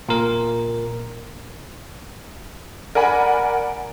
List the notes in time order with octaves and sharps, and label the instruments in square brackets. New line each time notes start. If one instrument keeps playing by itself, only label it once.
[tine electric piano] A#2 A#4
[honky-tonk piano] A#4 D5 F#5 G#5 B5